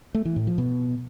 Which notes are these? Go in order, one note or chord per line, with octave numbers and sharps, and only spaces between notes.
A3
E3
A2
F3
B2